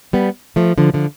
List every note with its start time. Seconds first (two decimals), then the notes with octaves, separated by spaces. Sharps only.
0.13 G3 B3
0.56 F3 A3
0.78 D3 F3
0.94 D3 F3